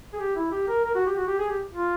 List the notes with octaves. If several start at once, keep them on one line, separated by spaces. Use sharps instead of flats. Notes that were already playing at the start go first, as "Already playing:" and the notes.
G#4
G4
E4
G4
A#4
A#4
F#4
G4
F#4
G4
G#4
G4
F4